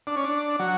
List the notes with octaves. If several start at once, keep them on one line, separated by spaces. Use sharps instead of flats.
D4
C#4
D4
F#3